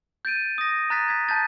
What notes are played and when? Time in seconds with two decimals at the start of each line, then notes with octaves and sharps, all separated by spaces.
0.25 G6 A6 D7 D#7
0.58 D#6 A#6
0.90 A#5 F#6 A6 B6
1.08 G#6 B6
1.29 A5 G6 A6